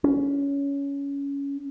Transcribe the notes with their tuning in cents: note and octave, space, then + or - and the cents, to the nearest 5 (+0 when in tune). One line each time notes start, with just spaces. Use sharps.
C#4 +20